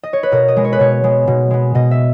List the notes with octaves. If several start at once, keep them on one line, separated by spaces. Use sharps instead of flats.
D#5
C#5
B4
B2 A#4
D#5
G#3 B3
C#5
B4
B2 C#5
G#3 B3
B2
G#3 B3
B2 D#5
E5